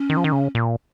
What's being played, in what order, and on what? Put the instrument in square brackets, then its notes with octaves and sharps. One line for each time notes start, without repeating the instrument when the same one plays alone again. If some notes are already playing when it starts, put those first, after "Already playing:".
Already playing: [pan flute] C#4
[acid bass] D#3
F3
D#3
C#3
A#2